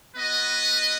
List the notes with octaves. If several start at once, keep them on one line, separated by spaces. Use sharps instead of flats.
B3 F#4 B4 D#5